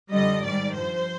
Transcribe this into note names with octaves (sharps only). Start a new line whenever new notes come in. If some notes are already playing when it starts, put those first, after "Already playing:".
F2 D3 G3 D#5
G#2 D#3 G3 D5
G2 F3 C5